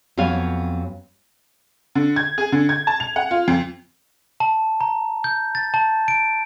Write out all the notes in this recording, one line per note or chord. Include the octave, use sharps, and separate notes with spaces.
F2 F#3 B3 B4 F5 G#5
D3
G#6
G#4
D3
G#6
A5
F7
F#5
F4
F2
A5
A#5
G6
A6
A5
D7